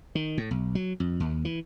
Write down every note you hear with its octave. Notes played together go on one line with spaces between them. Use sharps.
D#3
A2
B1
F#3
F2
D#2
E3